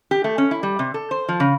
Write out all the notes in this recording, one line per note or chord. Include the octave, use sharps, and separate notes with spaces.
G4
A3
C#4
E4
G3
C3
A4
C5
F3
C#3